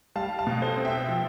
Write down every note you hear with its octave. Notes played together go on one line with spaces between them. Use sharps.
G3 F5 A5
F5 A5
B2
A4 C5
C4
E5 G5
F3